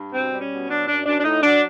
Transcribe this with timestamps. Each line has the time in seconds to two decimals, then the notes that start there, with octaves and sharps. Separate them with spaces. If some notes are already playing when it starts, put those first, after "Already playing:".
Already playing: G2
0.12 B2 C4
0.31 G3
0.41 C#4
0.50 B2
0.68 F#3 D4
0.87 F#2 D4
1.06 F#2 D4
1.19 D4
1.24 A2 D#4
1.43 F#3 D4